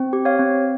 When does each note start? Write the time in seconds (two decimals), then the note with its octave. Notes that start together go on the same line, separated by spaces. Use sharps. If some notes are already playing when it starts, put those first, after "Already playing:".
Already playing: C4
0.13 G4
0.25 C#5 F5
0.39 C4